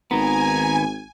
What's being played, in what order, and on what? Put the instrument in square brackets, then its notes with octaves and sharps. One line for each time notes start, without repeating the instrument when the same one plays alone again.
[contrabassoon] G#1 [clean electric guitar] D#3 B3 [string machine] G#5 [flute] A#5